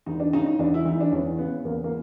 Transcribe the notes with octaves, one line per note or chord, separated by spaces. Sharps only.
E2 D#4
D4
C#3 D#4
D#4
E2 D4
E4
E3 D#4
D4
E2 C#4
C#3 B3
E2 A#3
A#3